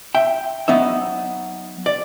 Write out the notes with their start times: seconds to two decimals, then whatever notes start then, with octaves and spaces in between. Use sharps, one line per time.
0.15 E5 G5
0.68 F#3 B3 D#4 E5
1.86 D5